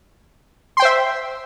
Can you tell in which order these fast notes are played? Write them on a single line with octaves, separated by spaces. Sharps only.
C6 G5 C5 E5